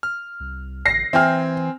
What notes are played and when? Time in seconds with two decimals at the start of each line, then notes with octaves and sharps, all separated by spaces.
0.03 F6
0.40 C2
0.85 A1 A#6 C7
1.13 E3 C4 E5 G5 G#5 F6